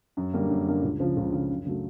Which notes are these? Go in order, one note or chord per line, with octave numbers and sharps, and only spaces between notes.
F#2
D3 G3 A#3
F#2
D3 G3 A#3
C#2
C#3 F3
C#2
C#3 F3
F#2
C#3 F#3 A3